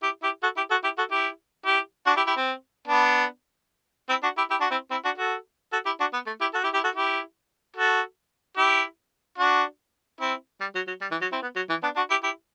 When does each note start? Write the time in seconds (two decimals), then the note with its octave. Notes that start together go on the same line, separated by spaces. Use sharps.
0.03 E4 G4
0.23 E4 G4
0.43 F#4 A4
0.56 E4 G4
0.70 F#4 A4
0.84 E4 G4
0.98 F#4 A4
1.11 E4 G4
1.66 E4 G4
2.06 D4 F#4
2.16 E4 G4
2.27 E4 G4
2.37 C4
2.87 B3 D4
4.09 C4 E4
4.23 D4 F#4
4.37 E4 G4
4.50 E4 G4
4.60 D4 F#4
4.70 C4 E4
4.91 C4 E4
5.04 D4 F#4
5.18 F#4 A4
5.72 F#4 A4
5.86 E4 G4
6.00 D4 F#4
6.13 B3
6.26 A3
6.41 E4 G4
6.53 F#4 A4
6.63 E4 G4
6.74 E4 G4
6.84 F#4 A4
6.95 E4 G4
7.76 F#4 A4
8.57 E4 G4
9.38 D4 F#4
10.20 C4 E4
10.61 G3
10.75 F#3
10.87 F#3
11.01 G3
11.11 E3
11.21 F#3
11.32 C4 E4
11.42 B3
11.56 F#3
11.69 E3
11.83 B3 D4
11.96 D4 F#4
12.10 E4 G4
12.23 E4 G4